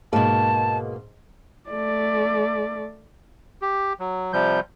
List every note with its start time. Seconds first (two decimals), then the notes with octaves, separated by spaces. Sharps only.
0.13 G#2 B2 A#3 A5
1.70 A3 D5
3.62 G4
4.00 F#3
4.33 C3 F3 G3 G6